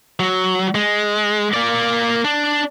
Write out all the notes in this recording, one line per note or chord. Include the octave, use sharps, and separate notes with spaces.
F#3
G#3
A#3 D5
D4